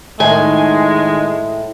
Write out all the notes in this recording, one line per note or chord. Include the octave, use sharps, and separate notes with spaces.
A2 D#3 G#3 G#5